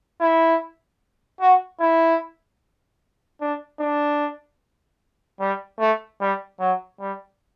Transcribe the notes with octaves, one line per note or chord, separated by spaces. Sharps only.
E4
F#4
E4
D4
D4
G3
A3
G3
F#3
G3